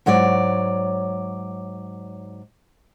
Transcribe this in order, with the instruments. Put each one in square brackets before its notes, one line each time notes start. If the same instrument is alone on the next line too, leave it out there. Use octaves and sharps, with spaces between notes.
[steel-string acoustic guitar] G#2 F#3 C#5 D5